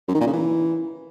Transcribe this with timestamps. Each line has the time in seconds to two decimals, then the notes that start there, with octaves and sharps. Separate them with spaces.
0.08 F#2
0.14 D#3
0.21 A#2
0.27 C#3
0.33 E3